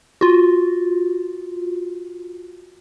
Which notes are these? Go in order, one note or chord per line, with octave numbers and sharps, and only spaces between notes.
F4 F#4